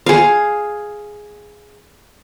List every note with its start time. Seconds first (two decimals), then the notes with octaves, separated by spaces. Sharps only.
0.06 G#4 F5